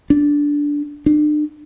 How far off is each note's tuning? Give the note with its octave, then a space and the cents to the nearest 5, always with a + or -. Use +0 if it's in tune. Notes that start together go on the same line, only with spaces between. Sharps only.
D4 -10
D4 +40